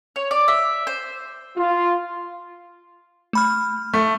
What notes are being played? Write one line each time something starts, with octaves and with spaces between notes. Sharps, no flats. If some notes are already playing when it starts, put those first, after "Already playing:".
C#5
D5
E5
C5
F4
A3 B5 F6
A3